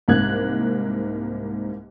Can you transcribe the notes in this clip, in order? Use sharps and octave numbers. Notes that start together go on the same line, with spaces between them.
C2 G#2 A#3 F#6 G#6